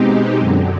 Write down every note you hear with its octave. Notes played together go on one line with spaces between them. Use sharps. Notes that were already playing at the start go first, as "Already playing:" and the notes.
Already playing: B2 G#3 C4 D#4 G4
F#2 D3 F#3